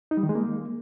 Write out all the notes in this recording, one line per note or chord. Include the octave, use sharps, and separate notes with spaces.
D#4
G3
D#3
G#3
A#3